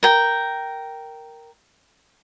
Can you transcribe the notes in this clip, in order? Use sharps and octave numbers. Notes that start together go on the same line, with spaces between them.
A#4 G5